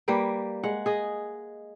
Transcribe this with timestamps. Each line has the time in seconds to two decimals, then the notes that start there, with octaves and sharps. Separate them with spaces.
0.08 G3 A#3 B4 G5
0.63 G#3 F#5
0.86 G#4 D#5